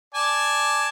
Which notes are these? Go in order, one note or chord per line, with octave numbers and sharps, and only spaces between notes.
D5 G#5 A5